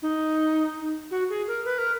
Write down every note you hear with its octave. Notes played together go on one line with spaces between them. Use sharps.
D#4
F#4
G#4
A#4
B4
A#4